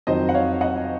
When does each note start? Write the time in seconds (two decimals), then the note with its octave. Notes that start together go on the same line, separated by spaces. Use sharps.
0.07 F2 D#3 F#3 C5 D#5
0.29 F#5
0.34 C#5 F5
0.61 D#5 F#5